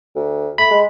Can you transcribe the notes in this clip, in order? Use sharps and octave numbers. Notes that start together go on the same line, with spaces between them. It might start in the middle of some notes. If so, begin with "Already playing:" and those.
D2
A3 B5
G#3